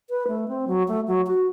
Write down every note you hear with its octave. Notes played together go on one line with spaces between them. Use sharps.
B4
A3
C4
F#3
A3
F#3
F#4